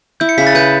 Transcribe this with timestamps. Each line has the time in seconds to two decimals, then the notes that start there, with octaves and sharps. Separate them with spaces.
0.20 E4 G6
0.29 C#7
0.38 C#3 B6
0.47 A6
0.55 B4 G6